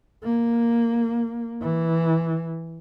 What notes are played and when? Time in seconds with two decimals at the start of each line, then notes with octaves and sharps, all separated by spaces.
0.23 A#3
1.62 E3